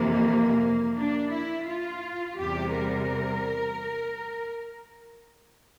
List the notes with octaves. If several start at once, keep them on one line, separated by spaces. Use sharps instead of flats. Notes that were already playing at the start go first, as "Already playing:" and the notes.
Already playing: F2 C3 E3 A#3
D4
E4
F4
E2 C3 G3 G4
A#4